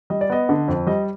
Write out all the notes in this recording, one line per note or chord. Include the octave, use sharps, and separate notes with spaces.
G3 D#5
D5
B3 D#5
D3
F2
G3 D#5